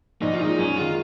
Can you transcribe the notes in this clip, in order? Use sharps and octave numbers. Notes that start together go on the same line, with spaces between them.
A#1 D#4
F4
A#2 G#3 D#4
F#2 C#4
D#3 G#3 F4